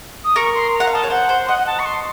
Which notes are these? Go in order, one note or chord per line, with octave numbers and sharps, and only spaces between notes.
D#6
A#4 C#6
C6
A#5
F#5
F5
D#5 A5
C#5
C5 F#5
C5
D#5 F#5
F#5
A5
C#6
C6